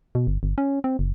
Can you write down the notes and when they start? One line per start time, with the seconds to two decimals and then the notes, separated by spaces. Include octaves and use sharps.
0.15 B2
0.27 G1
0.43 G1
0.58 C#4
0.84 C4
0.99 F#1